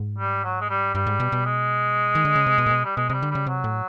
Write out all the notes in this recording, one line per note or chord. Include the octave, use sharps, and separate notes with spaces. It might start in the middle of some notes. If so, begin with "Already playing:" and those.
Already playing: G#2
G3
F#3
G#3
G3
G2 G3
G#2
B2
B2
G#3
D#3
D3
C#3
C3
B2
A#2
B2
G3
B2 G#3
C3 G3 G#3
D3
C#3 G3
C3 F#3
A2